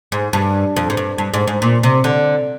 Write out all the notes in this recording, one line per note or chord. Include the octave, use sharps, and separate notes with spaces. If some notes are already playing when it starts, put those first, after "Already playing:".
G#2
G2
F2
G#2
G2
G2
G#2
G#2
A#2
C3
D3